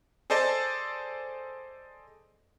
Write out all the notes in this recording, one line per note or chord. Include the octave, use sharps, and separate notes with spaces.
G#4 A4 C5 D5 D#5 A5